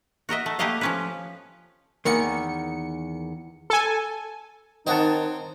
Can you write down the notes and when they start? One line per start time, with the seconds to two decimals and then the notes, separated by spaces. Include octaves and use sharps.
0.29 F#4 A#4 D#5 E5
0.46 A3
0.59 A3 A#3 G4 B4 D#5 F5
0.81 F3 C#4 B4
2.05 E2 D#3 A#3 C#7
3.70 A4 G#5
4.87 D#3 C4 D#4 C5 C#5 D#5 F#5 A5